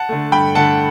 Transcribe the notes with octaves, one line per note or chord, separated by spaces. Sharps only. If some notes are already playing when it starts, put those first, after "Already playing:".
Already playing: F#5 A5
D3 A3
G2 G5 B5
D3 A3 F#5 A5